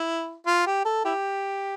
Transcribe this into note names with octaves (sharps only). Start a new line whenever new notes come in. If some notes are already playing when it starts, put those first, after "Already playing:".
Already playing: E4
F4
G4
A4
E4 G4